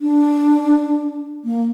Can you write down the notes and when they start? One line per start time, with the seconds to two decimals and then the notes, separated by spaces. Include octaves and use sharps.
0.01 D4
1.44 A#3